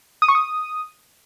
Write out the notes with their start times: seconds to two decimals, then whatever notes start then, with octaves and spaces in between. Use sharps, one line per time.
0.22 D#6
0.28 C#6
0.35 D#6